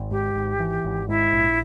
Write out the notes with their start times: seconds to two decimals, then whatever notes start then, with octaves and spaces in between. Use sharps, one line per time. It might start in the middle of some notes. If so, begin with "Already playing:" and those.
Already playing: G#1
0.11 G#2 G4
0.35 G#1
0.59 E3
0.84 G#1
1.08 G#2 E4
1.32 A#1